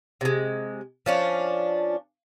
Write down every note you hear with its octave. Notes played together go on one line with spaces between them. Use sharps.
C3 G#3
F3 C#4 D4